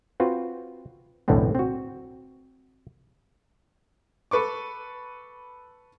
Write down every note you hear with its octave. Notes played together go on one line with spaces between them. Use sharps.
C4 F4 F#4 B4
B1 E2 A2 D3 B3 C4
C4 F#4
A4 B4 C#6 D6